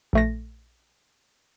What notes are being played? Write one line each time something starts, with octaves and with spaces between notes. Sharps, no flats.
A#1 A3 A#6